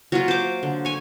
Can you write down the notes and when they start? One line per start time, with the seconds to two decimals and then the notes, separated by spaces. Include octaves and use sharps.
0.12 F#3 A#3 F4
0.28 C5 D6
0.63 D3
0.85 C#5 G#5